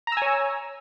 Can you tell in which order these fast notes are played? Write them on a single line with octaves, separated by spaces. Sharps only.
A#5 E6 G#5 C#5